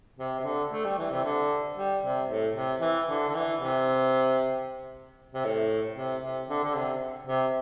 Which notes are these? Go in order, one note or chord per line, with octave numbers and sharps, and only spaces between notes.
C3
C3
D3
A3
G3
E3
C3
D3
G3
C3
A2
C3
E3
D3
D3
E3
C3
C3
A2
C3
C3
D3
D3
C3
C3